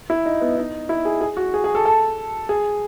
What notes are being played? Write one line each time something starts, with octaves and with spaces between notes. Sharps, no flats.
E4
D#4
B3
D#4
E4
G#4
G#4
F#4
G#4
G#4
A4
A4
G#4